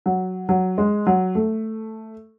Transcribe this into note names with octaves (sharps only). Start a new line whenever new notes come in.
F#3
F#3
G#3
F#3
A3